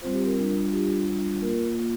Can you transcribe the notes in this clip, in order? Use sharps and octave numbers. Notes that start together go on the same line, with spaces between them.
G3 C4 F4 C5
G4
A#4
G3 D4 F4 A#4
G3 D4 F4 G4
G3 D4 F4
A#3 F4 A#4
A#3 F4